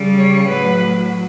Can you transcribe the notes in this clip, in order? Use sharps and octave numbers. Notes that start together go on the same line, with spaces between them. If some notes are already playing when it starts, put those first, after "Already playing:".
Already playing: C#3 G3
C#5
A2 F#3 B4